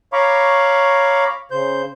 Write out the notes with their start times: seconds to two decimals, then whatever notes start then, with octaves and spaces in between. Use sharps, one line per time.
0.13 C#5 F5 A#5 B5 C#6 D6
1.51 C#3 C5 G6